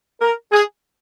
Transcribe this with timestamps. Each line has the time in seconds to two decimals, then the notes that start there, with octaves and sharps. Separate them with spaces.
0.22 A#4
0.52 G#4